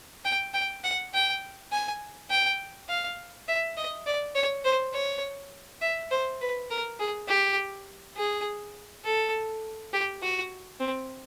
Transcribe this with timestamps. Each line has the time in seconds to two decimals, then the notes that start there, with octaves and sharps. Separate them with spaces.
0.25 G5
0.54 G5
0.84 F#5
1.14 G5
1.72 G#5
2.30 G5
2.89 F5
3.48 E5
3.77 D#5
4.06 D5
4.35 C#5
4.65 C5
4.94 C#5
5.81 E5
6.11 C5
6.41 B4
6.71 A#4
7.00 G#4
7.28 G4
8.16 G#4
9.04 A4
9.93 G4
10.22 F#4
10.80 C4